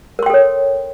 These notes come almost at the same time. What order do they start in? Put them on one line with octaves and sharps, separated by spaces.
A#4 C6 G5 A4 C#5